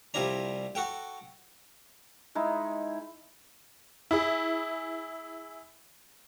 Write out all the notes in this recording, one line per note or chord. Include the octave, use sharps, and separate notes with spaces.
C2 F3 G3 E4 D5 A#5
F#4 A4 G5
G#3 D#4 E4
E4 G#4